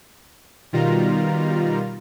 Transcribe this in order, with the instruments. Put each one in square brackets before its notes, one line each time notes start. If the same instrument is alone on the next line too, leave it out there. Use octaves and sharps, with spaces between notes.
[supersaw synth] B2 D#3 G3 F4 A#5